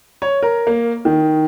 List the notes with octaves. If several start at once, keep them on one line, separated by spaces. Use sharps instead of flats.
C#5
A#4
A#3
D#3